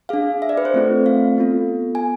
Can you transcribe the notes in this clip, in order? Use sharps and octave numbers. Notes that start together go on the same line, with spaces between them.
D4 G#4 F5
E5
D5
B4
C5
A3 C4 F4 A4
F5
B3 F4 A4
G#5